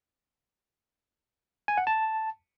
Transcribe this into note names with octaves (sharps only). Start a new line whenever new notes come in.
G#5
F#5
A5